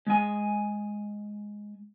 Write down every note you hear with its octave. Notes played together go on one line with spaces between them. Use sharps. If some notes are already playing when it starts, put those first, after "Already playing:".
G#3 G#5